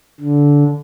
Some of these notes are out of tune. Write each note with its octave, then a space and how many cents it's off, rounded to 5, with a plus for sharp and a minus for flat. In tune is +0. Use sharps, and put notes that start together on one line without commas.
D3 -20